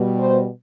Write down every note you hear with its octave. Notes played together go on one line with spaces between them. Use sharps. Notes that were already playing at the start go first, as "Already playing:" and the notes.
Already playing: B2 G3
C5